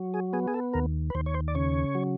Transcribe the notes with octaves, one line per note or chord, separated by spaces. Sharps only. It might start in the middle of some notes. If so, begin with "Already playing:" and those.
Already playing: F#3
G#4
B3 G#4
G#4
A4
D#2 A#4
B4
D#2 C5
C#5
C5
D5
C#3 C#5
F#3